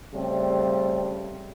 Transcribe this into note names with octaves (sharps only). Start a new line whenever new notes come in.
C#3 G3 A3 C4